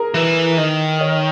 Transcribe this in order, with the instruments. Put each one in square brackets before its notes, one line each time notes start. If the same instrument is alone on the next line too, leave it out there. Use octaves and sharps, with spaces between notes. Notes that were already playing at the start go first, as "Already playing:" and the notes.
Already playing: [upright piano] G#4 A#4
[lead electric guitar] E3 [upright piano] B4
[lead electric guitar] D#3
[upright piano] C#5